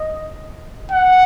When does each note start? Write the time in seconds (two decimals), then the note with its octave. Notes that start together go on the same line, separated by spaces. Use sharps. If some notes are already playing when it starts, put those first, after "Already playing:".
Already playing: D#5
0.91 F#5